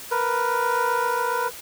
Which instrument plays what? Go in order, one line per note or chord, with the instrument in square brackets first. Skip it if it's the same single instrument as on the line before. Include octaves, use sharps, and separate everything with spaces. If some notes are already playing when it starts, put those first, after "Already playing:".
[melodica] A#4 B4